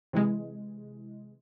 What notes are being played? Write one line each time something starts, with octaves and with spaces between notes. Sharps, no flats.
C3 E3 G#3